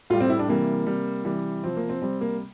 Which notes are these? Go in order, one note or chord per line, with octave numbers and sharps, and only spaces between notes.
A2 G3 F4
C4
E4
D4
C3 E3 G3 A#3
C3 G3
C3 E3 G3
C3 F3 C4
A#3
C4
C3 G3 C4
A#3